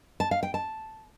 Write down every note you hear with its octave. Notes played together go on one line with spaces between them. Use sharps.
A5
F5
G5
A5